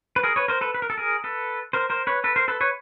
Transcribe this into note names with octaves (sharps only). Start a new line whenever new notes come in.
B4
G#4 A#4
B4 C#5
A#4 C5
A4 B4
B4
A#4
A4
G#4 A#4
A4 B4
A#4 C5
A#4 C5
B4 C#5
A4 B4
A#4 C5
A4 B4
B4 C#5